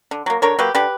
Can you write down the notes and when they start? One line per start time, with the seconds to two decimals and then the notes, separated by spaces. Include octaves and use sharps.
0.11 D3
0.26 F#3 A#3
0.42 D3 A#4 C#5
0.59 F#3 A#3 G4 B4
0.75 D3 G4 B4